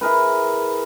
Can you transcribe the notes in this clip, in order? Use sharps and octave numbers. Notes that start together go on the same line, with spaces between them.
E4 G#4 A#4 B4